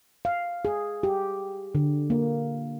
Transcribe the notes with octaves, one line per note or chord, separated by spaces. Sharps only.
F5
G#4
G4
D3
A#3